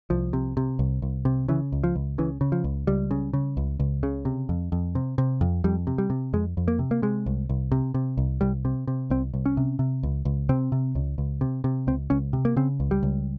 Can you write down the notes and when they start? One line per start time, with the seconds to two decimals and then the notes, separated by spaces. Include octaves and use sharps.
0.10 C2 F3
0.33 C3
0.57 C3
0.79 C2
1.02 C2
1.25 C3
1.48 C#3 E3
1.72 C#2
1.84 F3
1.96 C#2
2.18 C#3 E3
2.41 C#3
2.52 F3
2.64 C#2
2.87 C#2 G3
3.11 C#3
3.33 C#3
3.57 C#2
3.80 C#2
4.03 C#3
4.25 C3
4.49 F2
4.72 F2
4.95 C3
5.18 C3
5.41 F2
5.64 F2 G3
5.87 C3
5.98 G3
6.10 C3
6.33 F2 G#3
6.57 F2
6.68 A#3
6.79 C3
6.91 A#3
7.02 C3 G#3
7.26 C2
7.49 C2
7.72 C3
7.94 C3
8.18 C2
8.41 C2 G3
8.65 C3
8.88 C3
9.10 C2 C4
9.34 C2
9.46 C#4
9.57 C3
9.79 C3
10.03 C#2
10.25 C#2
10.49 C3 C4
10.72 C3
10.95 C#2
11.18 C#2
11.41 C3
11.64 C3
11.87 C#2 C4
12.10 C#2 C#4
12.33 C3
12.45 A#3
12.56 C#3 C4
12.80 C#2
12.91 G3
13.03 C#2